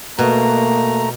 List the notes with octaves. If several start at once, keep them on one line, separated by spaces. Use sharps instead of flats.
B2 A3 A#3 A#5